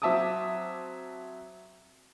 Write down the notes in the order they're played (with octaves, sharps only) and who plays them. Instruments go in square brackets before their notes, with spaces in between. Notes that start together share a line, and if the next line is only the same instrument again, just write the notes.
[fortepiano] F#3 C4 E5 A5 D6 D#6